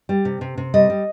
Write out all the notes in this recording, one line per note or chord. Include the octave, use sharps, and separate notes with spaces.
G3
C3
C3
C3
G3 D#5
G3